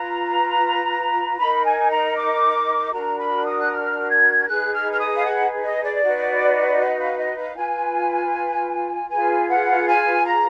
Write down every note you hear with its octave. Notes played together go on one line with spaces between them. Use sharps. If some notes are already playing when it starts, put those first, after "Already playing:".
Already playing: F4 B4 A#5
D#4 A#4 B5
G#5
A#5
D6
D4 F#4 A#4 A#5
B5
D#6
F#6
F6
G#6
D#4 G#4 B4 F#6
F6
F6
D#6
F5
F#5
D#5
D5
D#4 F#4 B4
D#5
F5
D#5
F5
F4 B4 G#5
F4 G#4 B4 G#5
F#5
G#5
A#5